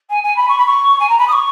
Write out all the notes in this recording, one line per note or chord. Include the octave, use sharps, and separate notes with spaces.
G#5
G#5
B5
C#6
B5
C#6
G#5
A#5
B5
D#6
C#6